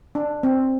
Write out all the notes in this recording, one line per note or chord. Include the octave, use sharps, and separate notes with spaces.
D4
C4